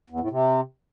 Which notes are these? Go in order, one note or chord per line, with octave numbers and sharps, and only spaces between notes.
E2
A2
C3